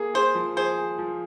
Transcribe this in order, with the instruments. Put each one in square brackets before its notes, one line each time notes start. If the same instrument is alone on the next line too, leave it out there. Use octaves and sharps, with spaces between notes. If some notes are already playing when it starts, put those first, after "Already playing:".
Already playing: [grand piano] A#3 G#4
[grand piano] G#4 [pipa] C5
[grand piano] F3
[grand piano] G#4 [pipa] C5
[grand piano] G#4
F3